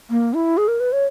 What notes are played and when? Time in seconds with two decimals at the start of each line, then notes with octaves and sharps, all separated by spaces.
0.10 A#3
0.34 E4
0.57 G#4
0.68 A#4
0.80 B4
0.92 C#5